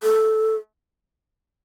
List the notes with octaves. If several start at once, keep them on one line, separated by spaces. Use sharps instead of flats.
A4